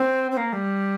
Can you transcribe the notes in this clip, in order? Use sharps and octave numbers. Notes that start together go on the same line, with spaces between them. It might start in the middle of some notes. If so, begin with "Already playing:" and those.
Already playing: C4
C4
A#3
G3